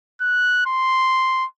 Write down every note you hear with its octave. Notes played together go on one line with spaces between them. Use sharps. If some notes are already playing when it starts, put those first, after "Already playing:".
F#6
C6